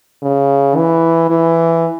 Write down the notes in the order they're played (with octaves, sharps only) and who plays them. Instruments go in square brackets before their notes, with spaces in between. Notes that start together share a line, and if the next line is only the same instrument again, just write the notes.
[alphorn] C#3
E3
E3